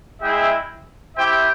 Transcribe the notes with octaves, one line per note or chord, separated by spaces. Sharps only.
G#3 E4 G#4 E5 G5
E4 G4 C5 E5 G5